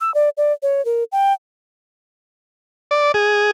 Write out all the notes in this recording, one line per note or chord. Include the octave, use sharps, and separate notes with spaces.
E6
D5
D5
C#5
A#4
G5
D5
G#4